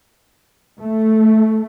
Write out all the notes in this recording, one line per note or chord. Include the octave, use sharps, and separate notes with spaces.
A3